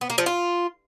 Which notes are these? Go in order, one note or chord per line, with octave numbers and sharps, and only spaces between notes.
B3
A#3
F3
F4